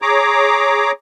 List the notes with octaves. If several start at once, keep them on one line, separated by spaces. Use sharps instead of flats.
G#4 C#5 A#5 D6